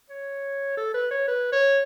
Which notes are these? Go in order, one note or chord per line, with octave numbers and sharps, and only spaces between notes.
C#5
A4
B4
C#5
B4
C#5